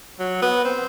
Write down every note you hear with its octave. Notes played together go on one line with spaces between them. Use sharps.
F#3
B3
C4